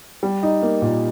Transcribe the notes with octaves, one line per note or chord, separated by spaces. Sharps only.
G3
D#4
A#3
A#2